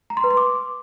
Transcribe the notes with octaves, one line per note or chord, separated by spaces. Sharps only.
A#5
C6
B4
C6
D6